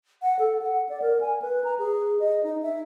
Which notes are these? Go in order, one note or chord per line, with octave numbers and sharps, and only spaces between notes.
F#5
A4
F#5
D5
A#4
G#5
B4
A#5
G#4
D#5
D#4
E5